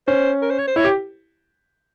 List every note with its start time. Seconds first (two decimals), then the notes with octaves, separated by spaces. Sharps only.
0.07 C#4 C5
0.42 A#4
0.51 C5
0.59 C#5
0.67 C5
0.76 E4 C#5
0.85 G4